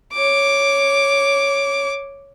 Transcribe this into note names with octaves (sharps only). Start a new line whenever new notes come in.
C#5 D6